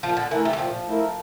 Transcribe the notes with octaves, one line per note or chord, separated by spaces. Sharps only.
A#2 F3
D3
E3 A3 E4 A#4
G3
E3
A#2 F3
A3 E4 A#4